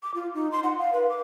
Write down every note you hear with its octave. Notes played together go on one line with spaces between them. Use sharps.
D6
F4
D#4
C6
F#5
F5
B4
D6